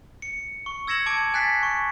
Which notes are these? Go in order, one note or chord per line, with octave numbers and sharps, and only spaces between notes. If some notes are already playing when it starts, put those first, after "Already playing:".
C#7
C#6
E6 G#6 A#6 C#7 E7 F#7
A5 D6 G#6 D7
G#5 F#6 A6 B6 C7
C#6